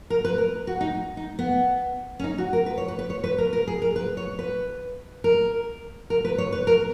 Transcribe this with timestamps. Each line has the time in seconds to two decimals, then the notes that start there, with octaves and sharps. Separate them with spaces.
0.10 A#4
0.25 B4
0.38 A#4
0.67 F#4
0.81 D#4
1.17 D#4
1.39 B3
2.20 C#4
2.24 D#4
2.38 F#4
2.53 A#4
2.66 B4
2.78 C#5
2.88 B4
2.99 B4
3.10 C#5
3.24 B4
3.38 A#4
3.53 A#4
3.67 G#4
3.82 A#4
3.96 B4
4.17 C#5
4.39 B4
5.24 A#4
6.10 A#4
6.25 B4
6.38 C#5
6.52 B4
6.67 A#4